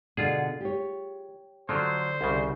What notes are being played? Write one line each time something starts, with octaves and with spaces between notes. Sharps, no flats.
B2 D3 D4 F4 G#4
G4 C#5
D3 F3 F#3 C5
C2 C#3